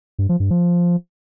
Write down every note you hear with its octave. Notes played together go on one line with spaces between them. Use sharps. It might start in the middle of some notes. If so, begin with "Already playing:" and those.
G2
F3
G2
F3